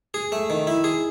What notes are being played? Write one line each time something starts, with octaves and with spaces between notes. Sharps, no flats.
G#4
A3
D#3
E4
G#4